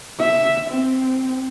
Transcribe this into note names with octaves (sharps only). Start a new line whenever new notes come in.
E5
C4